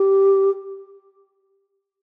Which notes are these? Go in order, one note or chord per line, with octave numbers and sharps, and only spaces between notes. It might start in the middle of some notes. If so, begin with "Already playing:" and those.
Already playing: G4